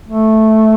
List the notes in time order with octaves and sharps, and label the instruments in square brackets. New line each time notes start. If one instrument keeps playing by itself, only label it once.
[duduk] A3